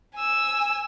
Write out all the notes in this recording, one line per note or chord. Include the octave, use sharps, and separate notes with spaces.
G#5 E6